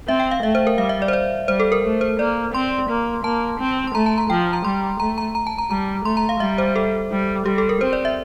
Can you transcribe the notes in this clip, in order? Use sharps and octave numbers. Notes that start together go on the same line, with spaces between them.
C4 E5
G5
F5
A3 E5
C5
A#4
G3 F5
E5
D5
C5
D5
G3 C5
A4
A#4
A3
C5
A#3 D5
C4 C6
A#3
A#3 A5
C4
C6
A3 A#5
A5
A#5
F3 G5
A#5
G3 C6
A3 A#5
A#5
A#5
A5
A#5
G3 A#5
A3 C6
A#5
F5
G3 E5
C5
A4
G3
G3 G4
A4
A#4
C4 C5
D5
E5